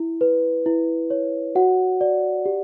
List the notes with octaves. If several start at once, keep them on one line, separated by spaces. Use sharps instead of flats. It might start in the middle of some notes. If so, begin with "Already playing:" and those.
Already playing: E4
B4
E4
C#5
F#4 F#5
D5
G4